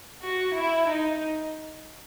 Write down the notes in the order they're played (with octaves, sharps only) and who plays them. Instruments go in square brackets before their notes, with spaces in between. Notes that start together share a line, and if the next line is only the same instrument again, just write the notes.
[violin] F#4
E4
D#4